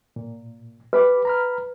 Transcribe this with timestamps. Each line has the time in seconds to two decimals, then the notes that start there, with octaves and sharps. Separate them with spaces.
0.16 A#2
0.93 G4 B4 B5 D6
1.25 A#5 B5 F6